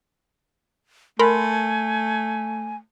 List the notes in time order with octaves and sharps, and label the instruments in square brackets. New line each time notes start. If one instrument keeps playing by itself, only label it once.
[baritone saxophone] A3 [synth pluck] A#4 B5 C6 [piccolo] G#5